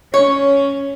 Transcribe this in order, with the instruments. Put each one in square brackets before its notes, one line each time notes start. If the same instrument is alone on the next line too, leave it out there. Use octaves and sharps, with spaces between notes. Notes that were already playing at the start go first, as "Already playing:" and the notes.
[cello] C#4 [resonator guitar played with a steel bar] C#5